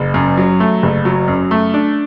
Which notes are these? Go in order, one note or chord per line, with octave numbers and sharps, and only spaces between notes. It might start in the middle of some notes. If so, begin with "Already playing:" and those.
Already playing: F#1
F#2
F#3
A3
F#1
F#3
F#2
A3
D4